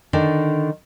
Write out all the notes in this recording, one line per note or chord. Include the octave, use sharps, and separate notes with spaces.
D3 D#3 D4